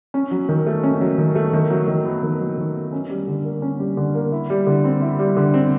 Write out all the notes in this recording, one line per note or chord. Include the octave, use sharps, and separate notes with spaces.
C#4
F#3
D#3
A3
C#4
F#3
D#3
A3
D#3
F#3
D#3
B3
D#3
F#3
D#3
B3
C#4
G3
D3
A#3
C#4
G3
D3
A#3
E4
G3
D3
C4
E4
G3
D3
C4